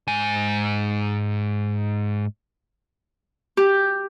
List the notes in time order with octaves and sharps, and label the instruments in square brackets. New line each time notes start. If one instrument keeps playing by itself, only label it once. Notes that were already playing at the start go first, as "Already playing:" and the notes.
[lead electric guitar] G#2 G#5
[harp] G4